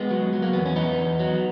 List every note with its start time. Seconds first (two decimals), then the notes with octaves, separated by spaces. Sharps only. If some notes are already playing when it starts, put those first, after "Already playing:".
Already playing: G#3 B3
0.11 F#3
0.33 F#3
0.42 A#3
0.53 E2 B3
0.65 C#4
0.76 E2 B3 D#4
0.98 E2
1.19 F#3